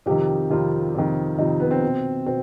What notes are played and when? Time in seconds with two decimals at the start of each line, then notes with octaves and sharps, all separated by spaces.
0.06 F2 C3 D#3 G4
0.50 F2 C3 D#3 F4
0.95 F2 C3 D#3
1.38 F2 C3 D#3 D#4
1.60 B3
1.71 C4
1.83 B2
2.26 B2 C4